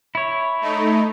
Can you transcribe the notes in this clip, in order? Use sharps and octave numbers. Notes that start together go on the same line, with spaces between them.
E4 C#5
A3 D#4